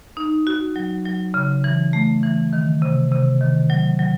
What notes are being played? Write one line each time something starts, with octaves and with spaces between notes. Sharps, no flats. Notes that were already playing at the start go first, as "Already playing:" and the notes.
D#4
F#4
F#3
F#3
C#3
E3
A3
E3
D#3
C3
C3
D#3
F#3
F#3